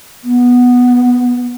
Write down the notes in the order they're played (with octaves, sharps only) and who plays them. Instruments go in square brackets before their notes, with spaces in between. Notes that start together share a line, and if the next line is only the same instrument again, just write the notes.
[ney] B3